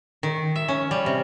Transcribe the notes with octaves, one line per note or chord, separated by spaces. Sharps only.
D#3
E5
C#4
G3
C3